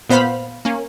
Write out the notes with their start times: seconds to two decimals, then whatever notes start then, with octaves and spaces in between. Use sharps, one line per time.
0.09 A#2 B3 C5 F5 B5
0.65 A#3 C#4